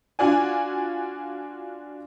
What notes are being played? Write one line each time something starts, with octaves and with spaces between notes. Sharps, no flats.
D4 F4 F#4 D5 G#5